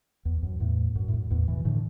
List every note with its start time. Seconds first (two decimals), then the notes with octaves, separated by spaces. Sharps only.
0.25 E2
0.43 F#2
0.60 E2 A2
0.95 F#2
1.08 A2
1.13 F#2
1.30 E2 A2
1.48 B2 E3
1.65 A2 D3